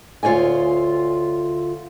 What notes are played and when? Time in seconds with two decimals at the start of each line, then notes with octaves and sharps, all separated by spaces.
0.23 D2 F4 C#5 D5 G#5